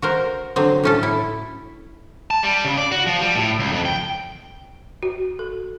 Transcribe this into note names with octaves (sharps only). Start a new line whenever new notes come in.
F#4 A#4 C5
D3 F#3 C4
A2 C#4 A4
E4
A5
G3
C#3
D5
F#4
F3
G3
A2
C#2
F2
G5
F#4
A4